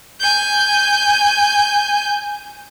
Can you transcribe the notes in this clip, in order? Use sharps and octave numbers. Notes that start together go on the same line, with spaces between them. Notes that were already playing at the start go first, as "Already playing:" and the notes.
G#5 G6